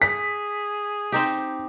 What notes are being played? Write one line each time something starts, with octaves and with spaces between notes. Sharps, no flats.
G#4 B6
C4 D#4 G4